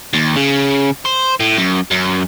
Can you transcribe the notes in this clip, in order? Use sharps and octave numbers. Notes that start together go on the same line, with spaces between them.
D#2
C#3
C5
A2
F#2
F#2